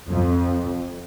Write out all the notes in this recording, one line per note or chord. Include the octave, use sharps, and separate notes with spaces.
F2